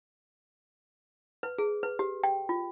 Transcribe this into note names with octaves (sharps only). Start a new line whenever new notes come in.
B4
G#4
B4
G4
G5
F4